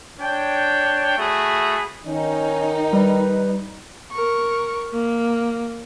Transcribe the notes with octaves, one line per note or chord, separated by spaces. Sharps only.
D4 C#5 G5
A3 F#4 G#4 B5
D#3 C#4 D#4
G3 B4
A#4 C#6
A#3